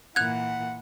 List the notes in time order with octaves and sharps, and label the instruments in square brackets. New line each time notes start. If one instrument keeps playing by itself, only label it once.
[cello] A#2 E3 [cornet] F#5 [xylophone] F#6 G#6